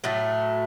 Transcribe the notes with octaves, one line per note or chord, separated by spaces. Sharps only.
A2 F#3 A3